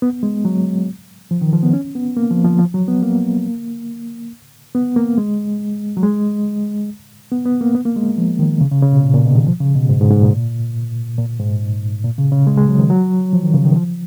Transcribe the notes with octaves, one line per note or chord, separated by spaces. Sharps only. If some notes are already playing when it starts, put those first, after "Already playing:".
B3
G#3
F#3
F3
D#3
F3
B3
C#4
B3
A#3
F3
F3
F3
F#3
B3
A#3
B3
A#3
G#3
F#3
G#3
B3
B3
A#3
B3
A#3
G#3
F3
D#3
C#3
C#3
C#3
B2
A#2
A#2
B2
D#3
F3
C#3
B2
G#2
G#2
G#2
A#2
A#2
G#2
A#2
C#3
C#3
G#3
G#3
F#3
D#3
F#3
F3
D#3
C#3
D#3
F3